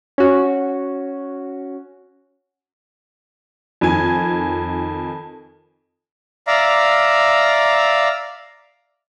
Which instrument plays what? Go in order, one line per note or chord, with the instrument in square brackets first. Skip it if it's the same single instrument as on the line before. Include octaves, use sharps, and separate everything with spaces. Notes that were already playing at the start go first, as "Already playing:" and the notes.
[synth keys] C#4 F#4
[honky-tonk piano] F2 D#3 G#5 G#6
[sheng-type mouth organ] D5 E5 F5 A#5